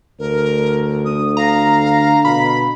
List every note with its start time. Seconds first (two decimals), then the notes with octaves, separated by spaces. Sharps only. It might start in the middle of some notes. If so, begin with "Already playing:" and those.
0.19 D2 A#4
1.05 D3 D#6
1.37 F5 A#5
2.25 B2 B5